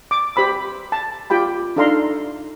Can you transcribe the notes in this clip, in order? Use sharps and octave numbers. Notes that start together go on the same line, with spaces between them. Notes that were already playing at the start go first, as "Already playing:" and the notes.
D6
G4 C5 B5 E6
A5
F4 G4 G5 B5
D4 D#4 A4 F5 A#5 C6